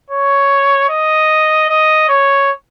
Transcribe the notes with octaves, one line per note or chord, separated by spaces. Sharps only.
C#5
D#5
D#5
C#5